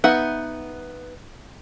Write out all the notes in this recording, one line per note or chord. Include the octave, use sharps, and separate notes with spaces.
B3 D#4 E5 F#5